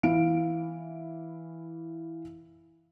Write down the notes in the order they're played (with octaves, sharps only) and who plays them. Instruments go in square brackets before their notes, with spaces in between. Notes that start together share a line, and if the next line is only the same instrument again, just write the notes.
[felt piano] E3 E4 F5 D7